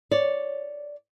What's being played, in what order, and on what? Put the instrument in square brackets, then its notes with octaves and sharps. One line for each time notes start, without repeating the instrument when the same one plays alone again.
[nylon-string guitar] C#5 D5